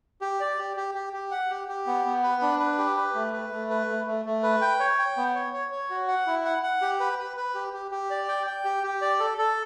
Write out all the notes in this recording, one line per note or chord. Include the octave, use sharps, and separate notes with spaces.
G4
D5
G4
G4
G4
G4
F#5
G4
G4
B3
B3
B4
D4
B4
G4
B4
A3
B4
A3
B4
A3
A3
A3
B4
G5
C#5
G5
B3
C#5
C#5
C#5
F#4
F#5
E4
F#5
F#5
G4
B4
B4
B4
G4
G4
G4
D5
G5
G5
G4
G4
D5
A4
A4